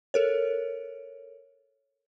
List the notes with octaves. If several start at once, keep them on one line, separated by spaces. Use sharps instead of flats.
A4 A#4 C#5